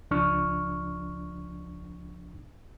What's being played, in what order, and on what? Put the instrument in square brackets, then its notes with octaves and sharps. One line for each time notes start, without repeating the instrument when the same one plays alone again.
[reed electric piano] C#2 F3 D4 C#6 F6